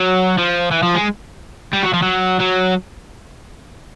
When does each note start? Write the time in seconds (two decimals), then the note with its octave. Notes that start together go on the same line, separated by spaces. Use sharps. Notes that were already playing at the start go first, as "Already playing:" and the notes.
Already playing: F#3
0.38 F3
0.71 E3
0.83 F3
0.95 G#3
1.73 G3
1.83 F#3
1.94 F3
2.03 F#3
2.40 F#3